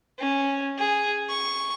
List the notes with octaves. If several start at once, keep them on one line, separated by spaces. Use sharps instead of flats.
C#4
G#4
C#6